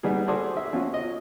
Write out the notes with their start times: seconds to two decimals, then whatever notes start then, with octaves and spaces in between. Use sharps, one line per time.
0.03 G3 B3 D#4 G#4
0.28 F#4 G#4 A4 C5 D5
0.57 E5
0.73 F3 C#4 F4 F#4
0.94 D#5